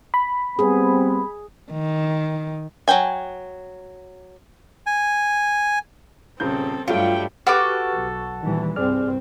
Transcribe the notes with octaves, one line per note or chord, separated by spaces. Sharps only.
B5
G3 B3 C4 G#4
D#3
F#3 G#4 G5 G#5
G#5
D#1 C#3 C4 A4 G6
G2 F#3 G3 A3 F4 G5
F#4 G4 A4 B4 D6 F6
B1
D2 A#2 D#3 E3 G3
C2 G2 C4 G#4 D5 F6